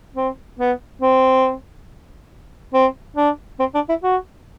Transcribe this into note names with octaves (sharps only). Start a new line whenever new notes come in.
C4
B3
C4
C4
D4
C4
D4
E4
F#4